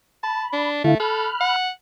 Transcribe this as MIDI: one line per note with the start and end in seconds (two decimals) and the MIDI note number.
0.23 0.44 81
0.23 0.72 83
0.53 0.84 62
0.84 0.95 50
0.84 0.96 57
0.84 0.95 64
0.84 0.95 77
1.00 1.28 69
1.00 1.56 83
1.00 1.56 89
1.00 1.56 90
1.41 1.69 78